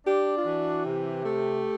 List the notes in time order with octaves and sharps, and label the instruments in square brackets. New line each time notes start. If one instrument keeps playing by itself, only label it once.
[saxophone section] D4 [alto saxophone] G4
[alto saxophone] F4
[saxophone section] E3 [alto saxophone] F#4
[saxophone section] C3 [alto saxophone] G4
[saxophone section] A3